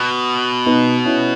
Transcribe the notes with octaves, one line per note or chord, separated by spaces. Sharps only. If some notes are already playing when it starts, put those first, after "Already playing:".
Already playing: B2
B3 D#4
C#4 E4